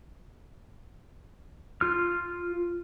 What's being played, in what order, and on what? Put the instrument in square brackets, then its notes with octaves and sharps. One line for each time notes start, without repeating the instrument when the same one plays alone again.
[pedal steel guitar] F4 F6